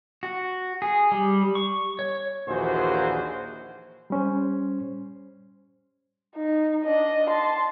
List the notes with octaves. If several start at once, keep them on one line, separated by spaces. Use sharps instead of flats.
F#4
G#4
G3
C#6
C#5
A#1 D#2 E3 F#4 G#4 C5
G3 C#4 C5
D#4
D4 D#5
A5 C6